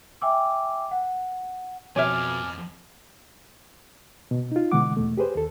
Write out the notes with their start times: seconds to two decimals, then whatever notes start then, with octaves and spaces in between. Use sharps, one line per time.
0.21 E5 G5 G#5 D6 E6
0.91 F#5
1.96 F2 B2 C#5 E5 G#5 D6 F6
4.31 B2
4.52 D#4 F4
4.72 B2 D3 E3 G#3 F#5 D6
4.97 E2 B2 A3
5.17 G4 G#4 B4 C5
5.35 D#2 A4